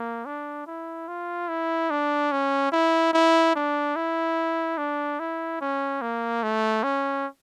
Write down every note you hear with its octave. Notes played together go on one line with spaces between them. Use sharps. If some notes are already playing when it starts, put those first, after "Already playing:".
Already playing: A#3
D4
E4
F4
E4
D4
C#4
E4
E4
D4
E4
D4
E4
C#4
A#3
A3
C#4